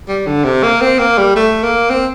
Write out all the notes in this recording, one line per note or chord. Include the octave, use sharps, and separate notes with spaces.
G3
D3
C3
A#3
C4
A#3
G3
A3
A#3
C4